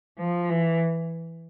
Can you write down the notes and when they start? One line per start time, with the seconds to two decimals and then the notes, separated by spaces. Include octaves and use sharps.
0.18 F3
0.49 E3